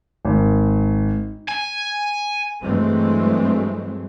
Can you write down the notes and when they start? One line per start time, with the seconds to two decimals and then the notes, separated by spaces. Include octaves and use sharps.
0.25 G#1
1.48 G#5
2.62 G2 E3 F#3 G#3 A3 C4